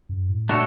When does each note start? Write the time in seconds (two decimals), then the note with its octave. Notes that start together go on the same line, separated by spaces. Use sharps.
0.09 F#2
0.29 A2
0.49 A#2 A3 D4 F#4 A4 C#5